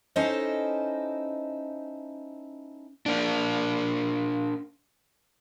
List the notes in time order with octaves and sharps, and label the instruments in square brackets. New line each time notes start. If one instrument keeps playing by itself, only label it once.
[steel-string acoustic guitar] C#4 D#4 E4 A4 C5 D#5
[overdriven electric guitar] A#3 D4